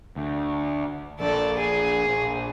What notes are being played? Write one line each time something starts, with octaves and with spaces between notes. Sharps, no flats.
D2
A#1 A4 D5
G#4
A#1